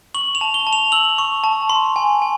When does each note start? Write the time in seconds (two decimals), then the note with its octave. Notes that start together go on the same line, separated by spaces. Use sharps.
0.14 C#6 F#7
0.35 F7
0.41 A5
0.54 G7
0.67 A5
0.73 F7
0.92 E6 F#7
1.18 C#6
1.44 A5
1.69 C6
1.96 G#5
2.22 G#5